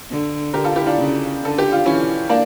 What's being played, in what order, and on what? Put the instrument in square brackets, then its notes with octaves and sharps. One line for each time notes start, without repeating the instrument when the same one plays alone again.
[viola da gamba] D3
[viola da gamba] D3 [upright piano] G4 A#4
[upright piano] F4 A4
E4 G4
D4 F4
[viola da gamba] C#3
[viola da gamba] D3 [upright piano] A4
[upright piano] G4
F4
[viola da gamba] E3 [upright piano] C#4 E4
[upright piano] A#3 D4